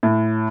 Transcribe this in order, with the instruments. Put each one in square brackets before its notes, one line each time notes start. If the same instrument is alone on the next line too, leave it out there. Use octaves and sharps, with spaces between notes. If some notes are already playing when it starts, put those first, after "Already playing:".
[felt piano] A2